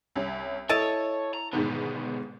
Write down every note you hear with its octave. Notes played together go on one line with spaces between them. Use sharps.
C2 C#4
E4 A4 C#5 D#5 A5
A#5
G#2 B2 D3 D#3 B3